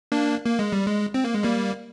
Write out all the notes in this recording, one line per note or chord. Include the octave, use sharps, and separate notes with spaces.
A#3 D4
A#3
G#3
G3
G#3
C4
A#3
G#3
G3 A#3